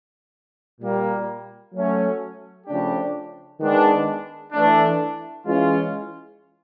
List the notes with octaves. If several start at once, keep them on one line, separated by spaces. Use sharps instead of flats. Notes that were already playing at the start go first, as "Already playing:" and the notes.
A#2 G3 A#3
F#3 A3 C#4
C#3 F3 A3 D4 G4
D#3 G#3 B3 D4
E3 A3 D4
E3 G#3 C#4 F4